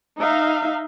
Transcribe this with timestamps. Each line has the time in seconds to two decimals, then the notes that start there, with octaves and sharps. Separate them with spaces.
0.19 D#4 E5 F5